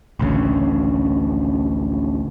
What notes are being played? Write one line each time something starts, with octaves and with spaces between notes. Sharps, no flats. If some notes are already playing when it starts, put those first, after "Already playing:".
A1 D2 C#3